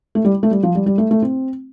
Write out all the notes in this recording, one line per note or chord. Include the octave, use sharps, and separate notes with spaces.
A3
G3
A3
G3
F3
G3
G3
A3
A3
C4